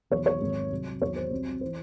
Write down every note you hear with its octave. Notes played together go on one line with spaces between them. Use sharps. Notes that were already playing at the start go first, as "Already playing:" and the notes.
E1 E2 D#3 F#3 C#5
C#5
G#1 G#2 D#3 F#3
C2 C3 F#3
E2 D#3 F#3 C#5
C5
C2 C3 F#3
C5
E3